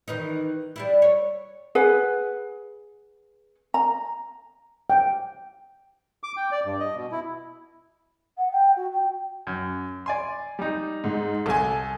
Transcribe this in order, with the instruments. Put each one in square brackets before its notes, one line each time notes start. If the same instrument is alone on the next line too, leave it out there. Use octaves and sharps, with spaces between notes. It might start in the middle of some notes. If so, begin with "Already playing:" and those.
[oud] D#3 E3 D#4
G3 D4 E4
C#5
[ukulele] G#4 B4 F#5
A#5
[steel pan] G5
[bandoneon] D6
G5
D5
G2
D#5
B2
E4
[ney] F#5
G5
F#4
G5
[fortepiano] F#2
D5 G#5 C6
G3 D#4
[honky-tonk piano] G#2
[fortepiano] C2 [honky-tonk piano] A4 G#5